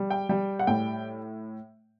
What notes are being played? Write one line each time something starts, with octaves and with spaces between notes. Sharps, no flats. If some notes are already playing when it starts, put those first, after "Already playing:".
Already playing: G3
G5
G3 G5
F#5
A2 G5